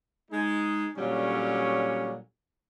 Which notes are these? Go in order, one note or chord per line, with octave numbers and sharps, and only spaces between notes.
G#3 D#4
A#2 D3 F#3 G3 C#4